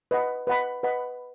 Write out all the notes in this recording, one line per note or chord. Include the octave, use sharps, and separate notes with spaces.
B4 D#5 F#5 B5
B4 D#5 F#5 B5
B4 D#5 F#5 B5